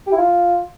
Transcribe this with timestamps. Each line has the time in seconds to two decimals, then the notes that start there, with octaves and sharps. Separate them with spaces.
0.07 G4
0.12 E4
0.17 F4